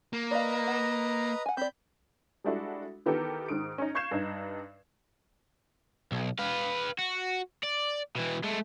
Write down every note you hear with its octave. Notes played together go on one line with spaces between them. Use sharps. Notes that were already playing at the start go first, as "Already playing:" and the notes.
A#3
B4 D5 D#5 F5 A#5
F#5
F#5 G#5
C4 D5 B5 G6
G3 G#3 D4 E4 F#4 A4
D#3 E3 B3 G4 A4 A#4
G#2 D#3 D#6 D7
C#4 D#4
F5 C#6 G6 G#6 C7 E7
G2 D#4
B1
B4 F5
F#4
D5
B2 E3
G#3 A3